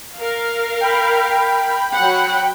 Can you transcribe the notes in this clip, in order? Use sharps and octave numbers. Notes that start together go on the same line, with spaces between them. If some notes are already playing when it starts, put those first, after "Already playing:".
A#4 F5
G5 B5
F#3 F#5